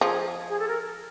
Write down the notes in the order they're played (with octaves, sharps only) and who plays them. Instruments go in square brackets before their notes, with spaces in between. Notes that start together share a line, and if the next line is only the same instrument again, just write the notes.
[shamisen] F3 [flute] G#4
[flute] G#4
A4
A#4